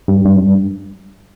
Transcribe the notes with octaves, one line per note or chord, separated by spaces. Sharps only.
G2
G2
F#2
G2